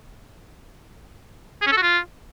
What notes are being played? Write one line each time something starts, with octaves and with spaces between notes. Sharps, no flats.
G#4
C#4
A4
F#4
F4